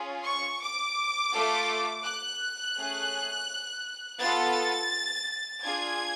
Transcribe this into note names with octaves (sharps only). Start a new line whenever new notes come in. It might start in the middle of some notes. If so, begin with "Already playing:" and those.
Already playing: C#4 F4 G#4
C#6
D6
A3 F4 A4
F#6
A3 C#4 G#4
B3 F4 A4 A6
D4 F4 G#4 G#6